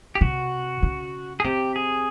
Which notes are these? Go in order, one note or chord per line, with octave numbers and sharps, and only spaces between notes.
G4
C3 F#4
C#3
G#4
C3 G4
G#4